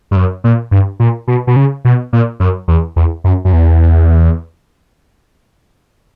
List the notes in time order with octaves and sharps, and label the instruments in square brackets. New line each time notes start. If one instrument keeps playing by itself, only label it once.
[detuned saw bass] G2
F#2
A#2
G2
A#2
B2
B2
C#3
B2
A#2
F#2
E2
E2
F#2
F#2
E2